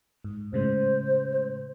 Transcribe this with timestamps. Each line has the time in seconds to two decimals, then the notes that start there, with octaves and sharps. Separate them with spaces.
0.24 G#2
0.53 A2 C#3 G#3 C5